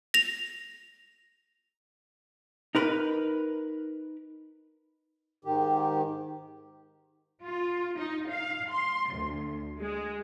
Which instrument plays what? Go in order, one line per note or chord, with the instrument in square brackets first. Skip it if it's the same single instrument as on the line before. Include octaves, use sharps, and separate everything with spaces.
[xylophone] A#6 F7
[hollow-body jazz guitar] D#4 A#4 B4
[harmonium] G#2 D#3 G4
[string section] F4
D#4
F5
C6
D2
G#3